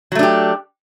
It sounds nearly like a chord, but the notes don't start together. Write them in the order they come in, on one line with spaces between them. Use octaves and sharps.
F#3 A3 D4 G4